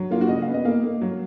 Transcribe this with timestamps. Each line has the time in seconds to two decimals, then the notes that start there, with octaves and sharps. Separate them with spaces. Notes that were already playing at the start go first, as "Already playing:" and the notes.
Already playing: F#3
0.11 A#3 F4
0.21 F#4
0.29 C#3 D#5
0.42 F5
0.48 B3
0.54 D#5
0.65 A#3 F5
0.84 A#3
1.01 F#3